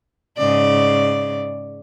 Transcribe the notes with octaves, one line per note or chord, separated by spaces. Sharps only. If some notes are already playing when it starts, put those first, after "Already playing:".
G#2 C#3 D5